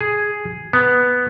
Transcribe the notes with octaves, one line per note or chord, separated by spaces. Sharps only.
G#4
B3